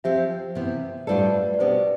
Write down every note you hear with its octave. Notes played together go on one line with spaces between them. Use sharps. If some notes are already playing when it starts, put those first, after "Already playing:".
F3 C4 G4 C5 E5
C3 E3 B3
A2 G3 D4 F4 A4 B4 D5
D5
B2 B3 D4 G4 C5